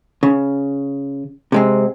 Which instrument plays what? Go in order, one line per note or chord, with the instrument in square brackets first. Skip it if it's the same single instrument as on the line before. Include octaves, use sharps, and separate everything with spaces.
[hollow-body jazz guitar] C#3
C3 G#3 C4